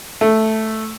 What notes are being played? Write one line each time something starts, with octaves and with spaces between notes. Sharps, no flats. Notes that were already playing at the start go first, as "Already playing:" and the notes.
A3